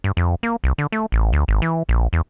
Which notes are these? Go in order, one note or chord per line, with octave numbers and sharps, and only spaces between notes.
G2
F2
A#3
C2
D3
A3
A1
D2
G#1
E3
A#1
E2